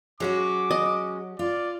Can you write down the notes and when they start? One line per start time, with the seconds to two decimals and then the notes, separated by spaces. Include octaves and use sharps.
0.20 F#3 G#3 C#4 F#4 D6
0.71 D#5
1.39 F4 D5